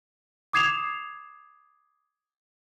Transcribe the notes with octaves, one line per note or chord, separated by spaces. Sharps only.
D6 D#6 G#6 C7 E7 F7